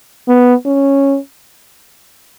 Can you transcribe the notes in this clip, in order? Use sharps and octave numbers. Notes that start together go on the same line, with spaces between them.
B3
C#4